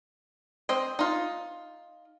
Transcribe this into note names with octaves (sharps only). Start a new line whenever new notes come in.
C4 D#5
D#4 F4